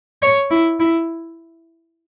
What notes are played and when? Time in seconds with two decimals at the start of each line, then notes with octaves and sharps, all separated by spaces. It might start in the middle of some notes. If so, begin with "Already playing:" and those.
0.22 C#5
0.51 E4
0.80 E4